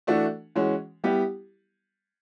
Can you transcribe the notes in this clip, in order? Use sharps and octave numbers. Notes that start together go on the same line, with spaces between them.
E3 A3 D4 F#4
E3 G#3 C#4 F#4
G3 B3 E4 G4